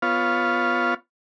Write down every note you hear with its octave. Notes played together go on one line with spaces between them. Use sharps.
B3 F4 C#5 F5